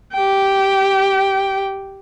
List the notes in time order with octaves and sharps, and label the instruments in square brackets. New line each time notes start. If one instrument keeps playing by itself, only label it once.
[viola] G4 G5